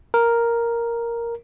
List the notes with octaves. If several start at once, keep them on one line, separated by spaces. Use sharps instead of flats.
A#4